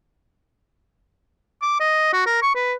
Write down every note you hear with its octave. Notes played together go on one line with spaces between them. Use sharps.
D6
D#5
F#4
A#4
C#6
B4